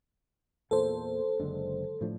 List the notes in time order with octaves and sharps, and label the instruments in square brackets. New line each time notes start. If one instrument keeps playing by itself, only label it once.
[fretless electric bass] E2 A#2 [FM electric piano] A4 C5
[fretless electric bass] F#1 D3 G#3
A2 F3 D4